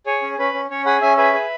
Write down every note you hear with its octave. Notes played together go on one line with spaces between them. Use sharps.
G#4 C#5
C#4
C#4 B4
C#4
C#4 C#5
G#4 F#5 B5
C#4 E5 G#5
G#4 B4 E5
G#4